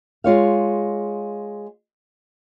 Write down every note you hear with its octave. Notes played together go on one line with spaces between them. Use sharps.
G#3 F4 C#5 F5